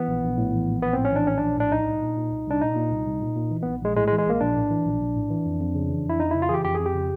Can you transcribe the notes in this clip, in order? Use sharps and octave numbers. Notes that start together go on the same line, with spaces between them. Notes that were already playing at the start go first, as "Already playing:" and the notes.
Already playing: E3 B3
A#1
A#1
A2
E3
A#1
A#1 B3
A2 C4
C#4
E3 D4
A#1 C#4
A#1 D4
A2 D4
C2 D#4
C2
A#2
A#2
C2
C2 D4
A#2 D#4
A#2
C2
C2
A#2
A#2
E3
A#1 B3
A#1 G#3
A2 G#3
G#3
E3
G#3
A#1 A#3
A#1 D4
A2
E3
A#1
A#1
A2
E3
F2
F2
C#3
E3
F2 E4
F2 D#4
C#3 E4
F4
E3 G4 G#4
F2 G4
F2 G#4
G4
C#3